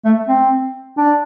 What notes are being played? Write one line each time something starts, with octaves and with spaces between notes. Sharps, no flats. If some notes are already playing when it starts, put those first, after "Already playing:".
A3
C4
D4